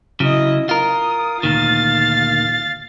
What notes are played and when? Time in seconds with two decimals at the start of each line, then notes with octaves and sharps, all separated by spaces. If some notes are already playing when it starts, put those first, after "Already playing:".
0.20 C#3 F#3 E4 D#5
0.69 F4 A#4 D#6
1.43 D2 A#2 D#3 F5 A6